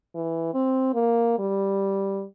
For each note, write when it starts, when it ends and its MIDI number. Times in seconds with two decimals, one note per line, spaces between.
0.15 0.53 52
0.54 0.92 60
0.94 1.37 58
1.39 2.24 55